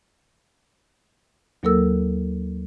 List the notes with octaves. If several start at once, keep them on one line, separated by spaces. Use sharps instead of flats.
D#2 F#3 A#3 A4 A#4 E6